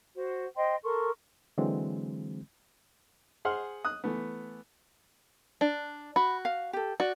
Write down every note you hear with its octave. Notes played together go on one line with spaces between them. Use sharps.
F#4 C5
C5 D#5 G5 C6
A4 A#4 C6 C#6
D3 E3 F#3 G#3 C4
G#4 C5 F#5 C6 F6
D#6 F#6
E3 A3 B3
D4
F#4 B5
F5
G4 A4
F#4 D5